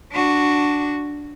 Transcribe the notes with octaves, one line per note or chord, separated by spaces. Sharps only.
D4 F#4